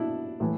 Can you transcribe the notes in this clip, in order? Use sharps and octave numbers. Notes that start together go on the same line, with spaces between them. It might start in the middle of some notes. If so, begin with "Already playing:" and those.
Already playing: B2 D4 E4
A2 E3